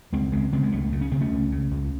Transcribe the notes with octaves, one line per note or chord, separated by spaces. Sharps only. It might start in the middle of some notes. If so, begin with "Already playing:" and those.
C#2 G#3 C4
C#3 G#3 C4
C#3 G#3 C4
G#3
C#2 F#3 A3
C#3
C#4
C#3 C4
A3 C#4
C#2
C#3
C#2